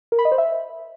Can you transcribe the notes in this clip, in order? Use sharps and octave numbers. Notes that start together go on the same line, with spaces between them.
A#4
B5
D#5
C5
E5